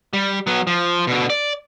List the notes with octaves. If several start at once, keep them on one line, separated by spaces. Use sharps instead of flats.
G3
F#3 B3
F3
B2 D3
D5